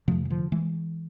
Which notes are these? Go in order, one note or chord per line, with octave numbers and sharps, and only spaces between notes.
F2 C3 F3 A3
E3
D3 F3
E3 G#3